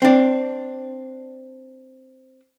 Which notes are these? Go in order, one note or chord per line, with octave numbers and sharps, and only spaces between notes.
C4 D4